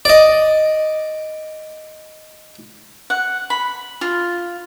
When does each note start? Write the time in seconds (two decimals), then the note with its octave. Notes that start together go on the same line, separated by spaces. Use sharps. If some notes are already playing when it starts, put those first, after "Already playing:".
0.05 D5 D#5
3.10 F#5
3.50 B5
4.01 F4